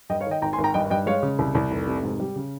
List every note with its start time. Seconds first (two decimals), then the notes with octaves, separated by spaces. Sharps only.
0.09 G2 D#5 G5
0.21 C#5 F5
0.27 D#3 D#5 G5
0.42 G#1 G5 A#5
0.53 G#5 C6
0.58 G#1
0.64 G5 A#5
0.74 G2 D#5 G5
0.90 G2 D#5 G5
1.06 G#3 C#5 F5
1.23 C#3
1.39 C2
1.55 C2
1.71 F1
1.87 C3
2.03 G#2
2.20 G3
2.36 C#3